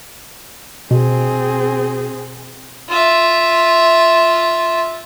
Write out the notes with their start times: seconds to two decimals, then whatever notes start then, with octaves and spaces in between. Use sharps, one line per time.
0.91 B2 C4 G#4
2.89 F4 E5